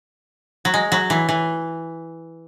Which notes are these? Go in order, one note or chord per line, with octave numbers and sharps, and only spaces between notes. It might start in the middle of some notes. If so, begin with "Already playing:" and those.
F#3
G#3
F#3
E3
E3